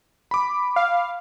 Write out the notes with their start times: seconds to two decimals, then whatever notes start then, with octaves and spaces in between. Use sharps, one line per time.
0.31 B5 D6
0.76 F5